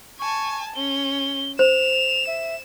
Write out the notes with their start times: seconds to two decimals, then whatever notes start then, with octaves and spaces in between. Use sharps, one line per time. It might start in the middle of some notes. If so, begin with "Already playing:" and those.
0.19 G#5 A5 C#6
0.76 C#4 G7
1.59 C5 E7 F7
2.27 E5